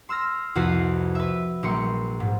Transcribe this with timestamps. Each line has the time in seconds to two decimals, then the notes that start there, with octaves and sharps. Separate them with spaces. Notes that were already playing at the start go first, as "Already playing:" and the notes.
0.09 C6 E6 F6 A#6
0.55 C2 F2 F#4 B4 C7
1.15 B4 E5
1.63 A#1 F#3 G3 A#3 C6 C#7
2.20 G#2